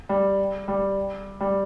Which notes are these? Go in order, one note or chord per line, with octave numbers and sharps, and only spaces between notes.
G3
G3
G3